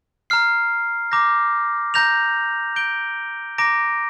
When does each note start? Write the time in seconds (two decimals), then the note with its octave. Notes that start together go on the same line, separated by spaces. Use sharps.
0.30 A#5 F6 C7
1.12 A#5 D6 G6 A#6
1.94 A#5 G6 A#6 F7
2.76 G6 D7 G7
3.58 A#5 D6 A#6 D7